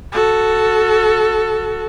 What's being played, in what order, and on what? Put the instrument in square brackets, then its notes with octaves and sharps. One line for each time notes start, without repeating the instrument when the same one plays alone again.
[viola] F#4 A4